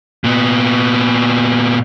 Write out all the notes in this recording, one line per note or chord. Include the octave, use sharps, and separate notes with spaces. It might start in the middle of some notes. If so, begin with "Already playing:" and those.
A#2 B3